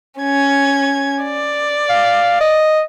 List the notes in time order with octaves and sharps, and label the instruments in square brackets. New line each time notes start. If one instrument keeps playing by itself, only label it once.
[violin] C#4 G#6
D5
[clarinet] F5
D#5